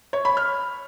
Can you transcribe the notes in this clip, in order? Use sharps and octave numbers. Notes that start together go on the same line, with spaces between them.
C#5
B5
F6